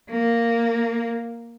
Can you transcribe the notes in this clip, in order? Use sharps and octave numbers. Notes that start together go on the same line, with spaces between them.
A#3